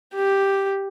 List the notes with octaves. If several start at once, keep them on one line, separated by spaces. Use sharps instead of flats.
G4